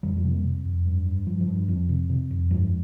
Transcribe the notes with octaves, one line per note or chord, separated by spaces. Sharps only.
F2 E3 G3
F3 G#3
C3
G3 A#3
C3
F2
G2
G2
G2 F3
F3
G2
F2 F3
C3
C3
F2
G2 F3 G#3